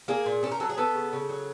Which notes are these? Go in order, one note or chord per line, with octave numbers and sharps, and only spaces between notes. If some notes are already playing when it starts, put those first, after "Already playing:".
A#3 G#4
A#2
C#4 A4
A#4
F#3 A4
G#4
B3 A4
C#3
C#3
F#3